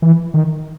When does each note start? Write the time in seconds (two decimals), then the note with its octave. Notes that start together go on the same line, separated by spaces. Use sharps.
0.02 E3
0.34 D#3